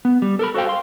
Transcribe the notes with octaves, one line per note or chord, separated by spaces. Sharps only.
B3
G3
A4 A#4 B5
F#4 A4 C5 F5 G5
F5 C6